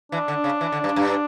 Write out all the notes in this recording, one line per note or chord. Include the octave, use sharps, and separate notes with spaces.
E3 D4
D3
C#3
E3
D3
G2
G2